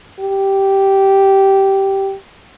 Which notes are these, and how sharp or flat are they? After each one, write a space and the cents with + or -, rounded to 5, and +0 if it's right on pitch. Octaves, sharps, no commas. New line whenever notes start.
G4 -10